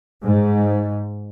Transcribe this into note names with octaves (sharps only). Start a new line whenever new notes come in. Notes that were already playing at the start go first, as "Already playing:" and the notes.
G#2